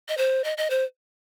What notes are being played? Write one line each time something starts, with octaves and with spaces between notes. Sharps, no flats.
D#5
C5
D#5
D#5
C5